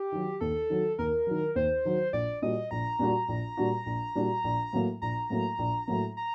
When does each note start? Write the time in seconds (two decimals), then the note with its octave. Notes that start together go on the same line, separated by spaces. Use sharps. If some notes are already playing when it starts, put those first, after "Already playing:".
Already playing: G4
0.12 D#3 F#3
0.41 D#2 A4
0.70 D#3 F#3
0.98 D#2 A#4
1.27 D#3 F#3
1.55 D#2 C5
1.85 D#3 F#3
2.13 A#1 D5
2.42 A#2 G3 D4 F#4 D#5
2.71 A#1 A#5
2.99 A#2 G3 D4 F#4
3.28 A#1
3.57 A#2 G3 D4 F#4
3.86 A#1
4.15 A#2 G3 D4 F#4
4.44 A#1
4.73 A2 F#3 A#3
5.02 A#1 A#5
5.30 A2 F#3 A#3
5.59 A#1
5.88 A2 F#3 A#3
6.17 A#5